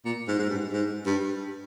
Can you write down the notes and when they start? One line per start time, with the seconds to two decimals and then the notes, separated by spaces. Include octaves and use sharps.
0.05 A#2
0.28 G#2
0.39 G#2
0.50 G2
0.72 G#2
1.06 G2